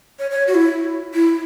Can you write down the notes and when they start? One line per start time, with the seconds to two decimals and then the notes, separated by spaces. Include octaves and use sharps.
0.19 C#5
0.31 C#5
0.47 F#4
0.55 E4
1.14 E4